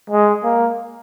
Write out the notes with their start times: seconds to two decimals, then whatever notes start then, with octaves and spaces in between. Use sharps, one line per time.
0.10 G#3
0.44 A#3